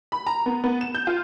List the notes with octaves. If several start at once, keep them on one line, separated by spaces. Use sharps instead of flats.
B5
A#5
B3
B3
E7
G6
F4